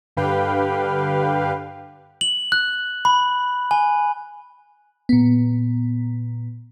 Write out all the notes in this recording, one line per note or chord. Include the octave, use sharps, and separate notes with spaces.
G2 D3 G4 B4 F5 G5
F#7
F#6
B5
G#5
A#2 B3